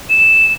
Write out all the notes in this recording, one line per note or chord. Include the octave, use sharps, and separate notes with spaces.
E7